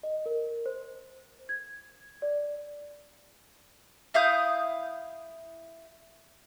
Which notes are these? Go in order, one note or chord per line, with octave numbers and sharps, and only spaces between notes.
D#5
A#4
C5
G#6
D5
E4 F5 D#6 G6